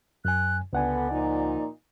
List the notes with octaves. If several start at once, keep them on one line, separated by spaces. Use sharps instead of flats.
F#2 G#5 F#6
C#2 D3 B3 D5 F#5 G#5
A#2 F3 D#4